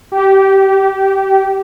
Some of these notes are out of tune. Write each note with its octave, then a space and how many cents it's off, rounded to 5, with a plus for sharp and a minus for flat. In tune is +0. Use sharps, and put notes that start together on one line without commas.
G4 -20